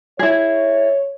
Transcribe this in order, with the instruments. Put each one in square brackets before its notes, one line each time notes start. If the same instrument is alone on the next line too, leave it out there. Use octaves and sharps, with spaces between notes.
[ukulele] E4 G#4 [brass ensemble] C#5